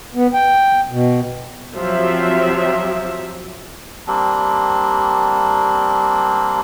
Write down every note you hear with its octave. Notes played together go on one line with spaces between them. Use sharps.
B3
G5
B2
F3 F#3 C4 G4 E5
G3 A#3 C4 D4